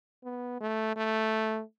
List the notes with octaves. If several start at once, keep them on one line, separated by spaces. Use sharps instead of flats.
B3
A3
A3